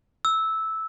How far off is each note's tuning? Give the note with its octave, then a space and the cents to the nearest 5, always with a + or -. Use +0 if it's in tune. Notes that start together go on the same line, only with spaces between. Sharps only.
E6 -10